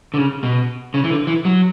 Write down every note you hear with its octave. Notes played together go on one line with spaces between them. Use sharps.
D3
C#3
B2
C#3
E3
D3
E3
F#3